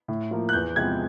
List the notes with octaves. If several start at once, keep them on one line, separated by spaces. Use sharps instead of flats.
A2
F3 A#3
F#6
E2 G6
C3 F3 G#3 B3 G#6